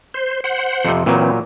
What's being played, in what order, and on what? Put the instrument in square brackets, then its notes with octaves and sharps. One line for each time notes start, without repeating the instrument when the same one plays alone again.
[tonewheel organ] C5
C5 F#5
[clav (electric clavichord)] F2 C3
[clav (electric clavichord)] A#2 F#3 [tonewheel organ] E3 C4